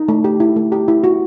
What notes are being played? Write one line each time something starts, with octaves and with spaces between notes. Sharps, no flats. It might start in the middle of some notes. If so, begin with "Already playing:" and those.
Already playing: D#4
A3
G4
E4
A3
G4
E4
F#4